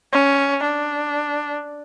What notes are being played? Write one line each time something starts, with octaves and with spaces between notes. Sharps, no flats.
C#4
D4